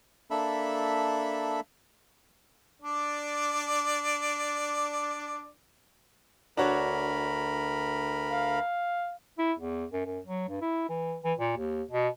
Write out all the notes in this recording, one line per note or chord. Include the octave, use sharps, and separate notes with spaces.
A#3 D4 A4 E5 B5
D4 D5
D2 D4 F#4 A#4 C#5 B5
F5
E4
E2
F#2
F#2
F#3
G2
E4
E3
E3
A#2
D#2
B2